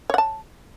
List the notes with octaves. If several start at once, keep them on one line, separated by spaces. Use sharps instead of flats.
C#5 F#5 A5